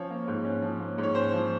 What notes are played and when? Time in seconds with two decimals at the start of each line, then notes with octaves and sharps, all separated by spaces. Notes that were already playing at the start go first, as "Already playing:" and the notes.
Already playing: F3 C#4 C#5
0.11 A#3
0.28 G#2
0.45 C#4
0.62 F3
0.80 A#3
0.98 G#2
1.03 C#5
1.15 C#4 C5
1.33 F3